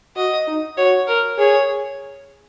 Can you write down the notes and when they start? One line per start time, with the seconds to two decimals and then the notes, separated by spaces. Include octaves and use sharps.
0.17 F#4 D#5
0.47 D#4
0.77 F#4 C#5
1.07 A#4
1.38 G#4 C#5